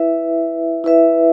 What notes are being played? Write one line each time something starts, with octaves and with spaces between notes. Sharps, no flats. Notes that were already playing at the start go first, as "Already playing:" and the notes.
Already playing: E4 B4 E5
E4 B4 E5